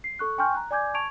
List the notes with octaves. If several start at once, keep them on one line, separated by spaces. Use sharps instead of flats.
C7
A4 C#6 F#6
G5 G#5 C6 C#6 F6 G6
A#5 F#6
D5 G#5 D6 G6 G#6
A5 C#6 G#6 D7 F7